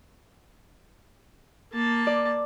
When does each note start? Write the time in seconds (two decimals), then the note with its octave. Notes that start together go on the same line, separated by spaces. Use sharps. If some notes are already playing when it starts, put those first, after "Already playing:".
1.73 A#3 A5
2.07 D5